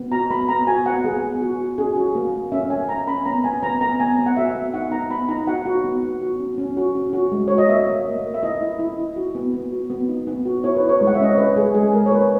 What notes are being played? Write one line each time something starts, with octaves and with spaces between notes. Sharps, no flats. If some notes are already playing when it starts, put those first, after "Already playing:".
Already playing: B3
F#4 A#5
B3 B5
B3 A#5
F#4 G#5
B3 F#5
B3 G#4
B3
F#4
F#4
C#4 G#4
F#4
A#3
A#3
C#4 E5
A#3 G#5
A#3 A#5
C#4 B5
B3 A#5
B3 G#5
B3 A#5
B3 A#5
B3 G#5
B3
F#5
F#4 E5
B3
D#4 F#5
D#4 A#5
B3 B5
D#4 A#5
F#4 F#5
F#4
B3
B3
F#4
C#4
C#4
F#4
C#4
F#4
G#3
F#4 C#5
D#5
A#3 E5
A#3
A#3
A#3
E5
E4 D#5
E4
E4
E4
F#4
B3
B3
F#4
B3
D#4
B3
F#4
E4 C#5
B4
E4
C#5
G#3
F#5
E5
C#4 D#5
C#5
C#4 B4
G#3 G#4
G#3 G#4
G#3 A#4
C#5
A#3 B4